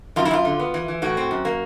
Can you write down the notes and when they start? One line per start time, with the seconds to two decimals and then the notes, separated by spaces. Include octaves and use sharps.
0.16 F#2 F4
0.25 E4
0.31 F#2 F4
0.45 D3
0.59 B3
0.74 E3
0.88 E3
1.02 A2 F#4
1.17 C4
1.31 F#2
1.45 A#3